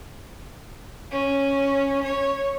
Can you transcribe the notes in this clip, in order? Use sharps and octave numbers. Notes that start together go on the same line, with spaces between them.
C#4
C#5